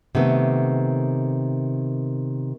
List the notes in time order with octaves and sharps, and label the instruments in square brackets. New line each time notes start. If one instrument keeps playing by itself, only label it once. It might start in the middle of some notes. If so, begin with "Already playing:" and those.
[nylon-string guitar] C3 D#3 A3 B3